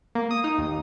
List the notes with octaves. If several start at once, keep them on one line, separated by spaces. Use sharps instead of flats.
A#3
D#6
D#4
D#2